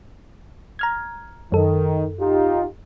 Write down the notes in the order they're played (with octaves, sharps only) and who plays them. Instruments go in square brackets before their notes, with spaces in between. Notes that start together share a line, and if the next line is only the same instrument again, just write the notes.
[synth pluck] A#5 F6 G#6
[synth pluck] F#2 A4 [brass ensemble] D#3
[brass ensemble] D#4 F4 G4